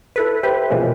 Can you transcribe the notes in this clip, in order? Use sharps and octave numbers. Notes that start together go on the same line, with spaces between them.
E4 A4 B4
E4 G4 B4 C5
B2 E3 F3 G#3 A#3 C#4